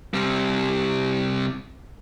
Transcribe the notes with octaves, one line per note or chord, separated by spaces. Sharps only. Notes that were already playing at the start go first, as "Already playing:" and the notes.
C3 G3